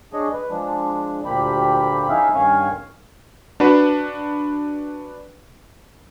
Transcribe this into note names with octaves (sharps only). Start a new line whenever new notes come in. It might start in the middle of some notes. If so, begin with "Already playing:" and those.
D4 G#4 C#5 D#5
B4
F3 G#3 D4
D2 A#2 F3 A#3 G4 B5
C#4 D#4 E4 G#4 E5 F5
G2 D#3 C#4 C#5 F5 G#5
D4 F#4 B4